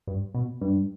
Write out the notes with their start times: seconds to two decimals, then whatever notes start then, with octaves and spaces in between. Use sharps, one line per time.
0.07 G2
0.35 B2
0.61 G2